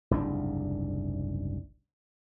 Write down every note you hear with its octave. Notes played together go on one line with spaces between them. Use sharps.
F#1 C2 G#2 D4